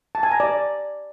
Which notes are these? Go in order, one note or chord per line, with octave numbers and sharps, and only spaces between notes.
A5
G#5
A#5
D5